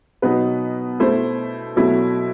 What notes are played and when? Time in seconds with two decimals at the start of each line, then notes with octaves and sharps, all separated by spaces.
0.22 B2 F#3 B3 D#4 B4
1.00 B2 A3 E4 C5
1.76 B2 F#3 A3 E4